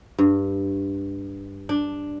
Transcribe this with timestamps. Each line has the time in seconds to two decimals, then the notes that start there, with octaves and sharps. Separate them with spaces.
0.18 G2
1.69 D4